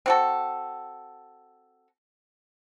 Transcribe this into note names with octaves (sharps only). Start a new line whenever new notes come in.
C4 F#4 A4